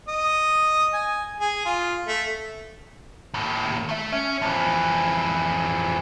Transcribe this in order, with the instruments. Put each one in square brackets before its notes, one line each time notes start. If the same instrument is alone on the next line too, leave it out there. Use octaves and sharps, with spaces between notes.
[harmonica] D#5
G#5
G#4
F4
A3
[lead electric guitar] D#2 A2
A3 E5
C#4
F2 E3